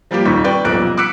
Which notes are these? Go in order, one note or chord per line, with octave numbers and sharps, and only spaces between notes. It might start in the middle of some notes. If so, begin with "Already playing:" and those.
F3 G3 A#3 G4
D#1 F2 D#3 C#6 B6
B4 D5 G5 C#6
D#1 B1 F3 F#6 D7
D6 E6 F#6 B6 C#7 D7